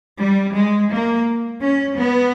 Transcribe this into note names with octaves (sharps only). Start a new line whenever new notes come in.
G3
G#3
A#3
C#4
B3